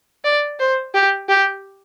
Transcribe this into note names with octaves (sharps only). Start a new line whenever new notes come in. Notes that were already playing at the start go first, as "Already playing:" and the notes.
D5
C5
G4
G4